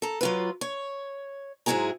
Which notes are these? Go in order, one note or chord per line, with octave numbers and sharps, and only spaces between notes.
A4 A#5
F#3 F4 B4
C#5
G#2 F#3 G#3 E4 G#4 A#5